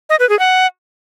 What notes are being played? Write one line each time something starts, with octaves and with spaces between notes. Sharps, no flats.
D#5
B4
G#4
F#5